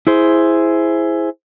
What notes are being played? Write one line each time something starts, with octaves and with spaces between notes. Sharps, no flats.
E4 G#4 C5